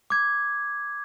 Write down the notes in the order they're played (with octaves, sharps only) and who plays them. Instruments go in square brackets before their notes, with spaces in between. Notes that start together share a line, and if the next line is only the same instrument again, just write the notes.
[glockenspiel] D6 G#6